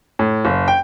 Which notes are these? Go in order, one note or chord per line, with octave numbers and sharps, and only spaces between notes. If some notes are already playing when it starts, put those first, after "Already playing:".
A2
F#1
G5